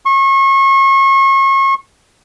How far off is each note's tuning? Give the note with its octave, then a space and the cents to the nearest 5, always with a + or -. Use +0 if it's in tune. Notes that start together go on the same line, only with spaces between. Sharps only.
C#6 -35